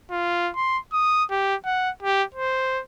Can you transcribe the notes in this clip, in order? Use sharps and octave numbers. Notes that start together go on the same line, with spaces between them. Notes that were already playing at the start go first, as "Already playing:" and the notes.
F4
C6
D#6
G4
F#5
G4
C5